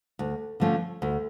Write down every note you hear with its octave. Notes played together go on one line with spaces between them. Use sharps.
D2
D3 F3 A3 C#4
D2